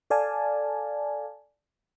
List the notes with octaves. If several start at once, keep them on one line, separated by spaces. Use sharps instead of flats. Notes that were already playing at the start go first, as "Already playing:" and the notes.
A4 D5 F5 G#5 A5